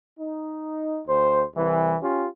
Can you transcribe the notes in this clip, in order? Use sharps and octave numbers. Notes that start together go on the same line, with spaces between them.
D#4
D2 C5
C2 E3
C#4 F4 G4